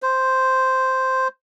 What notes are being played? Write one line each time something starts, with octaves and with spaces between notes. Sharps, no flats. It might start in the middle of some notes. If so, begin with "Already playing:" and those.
C5